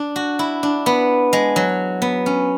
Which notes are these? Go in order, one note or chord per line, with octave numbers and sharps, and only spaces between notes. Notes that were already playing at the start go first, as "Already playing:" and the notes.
Already playing: D4
F#4
E4
D4
B3
G#3
F#3
B3
C#4